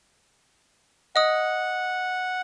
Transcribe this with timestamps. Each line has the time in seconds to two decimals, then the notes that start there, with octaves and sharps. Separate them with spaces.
1.16 D#5 F#5 D#6